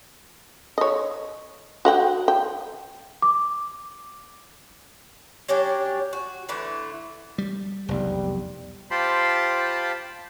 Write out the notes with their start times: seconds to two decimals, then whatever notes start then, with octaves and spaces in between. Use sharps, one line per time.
0.78 C#5 D#5
1.85 F#4 F#5 G5
2.28 G5
3.22 D6
5.48 F#3 C#4 D4 G4
6.13 F#4
6.49 D3 E3 A3
7.38 G3
7.89 F1 B1 E2 G3
8.91 F4 G4 C5 A5 B5 C6